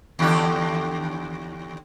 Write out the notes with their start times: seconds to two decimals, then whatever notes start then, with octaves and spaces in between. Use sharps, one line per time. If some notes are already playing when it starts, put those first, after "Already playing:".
0.19 D#2 D3 G4